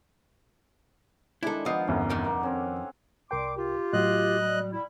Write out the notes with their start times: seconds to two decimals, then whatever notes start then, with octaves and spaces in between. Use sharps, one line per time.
1.43 D#3 G#3 D4 E4 A4
1.66 F3 B3 D#5 D#6 C7
1.87 G1 E2 B2 A#3 C#4
2.10 F2 D#3
2.24 A#3 F#4
2.41 C4 C#4 A4 A#4
3.31 C2 G3 A#4 G5 C6 D6
3.57 F4 G4
3.93 A2 F#3 F#4 D#5 F#6
4.40 G3
4.73 G3 E4